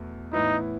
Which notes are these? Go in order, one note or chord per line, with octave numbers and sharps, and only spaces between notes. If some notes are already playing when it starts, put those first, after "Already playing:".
Already playing: E2 B2 A3
A2 E3 B3 D#4 E4